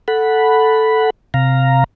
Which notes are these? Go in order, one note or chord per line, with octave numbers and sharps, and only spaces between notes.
A4 F#5 B5
C3 F5 A#5